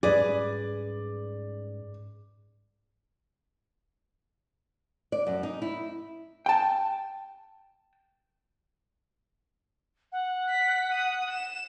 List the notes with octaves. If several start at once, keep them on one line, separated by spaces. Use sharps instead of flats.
G#2 G3 C#4 G#4 B4 D5
D5
F#2
D#4
E4
G5 A5
F#5
B6
D#6
E7